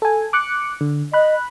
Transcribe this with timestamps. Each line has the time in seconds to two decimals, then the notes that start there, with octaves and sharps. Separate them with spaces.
0.02 A4 G#5
0.33 D6 F#6 C#7
0.81 D3
1.14 D#5 B5 F#6